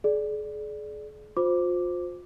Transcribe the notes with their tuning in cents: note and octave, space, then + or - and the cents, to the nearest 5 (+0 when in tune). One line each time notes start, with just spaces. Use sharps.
G#4 +40 D5 +0
F4 +35 C5 -5 D6 +0